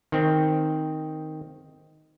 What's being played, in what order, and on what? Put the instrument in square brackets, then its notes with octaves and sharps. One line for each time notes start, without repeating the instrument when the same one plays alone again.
[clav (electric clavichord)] D#3 C4